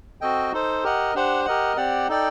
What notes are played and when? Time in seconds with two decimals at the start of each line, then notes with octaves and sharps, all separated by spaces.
0.21 C4 F#4 A4 D#5 G5
0.52 D#4 A4 C5
0.84 G4 A#4 D#5 F#5
1.15 D4 G4 C5 F#5
1.45 G4 A#4 D#5 F#5
1.77 C4 G4 D5 F#5
2.09 D#4 A4 D5 G5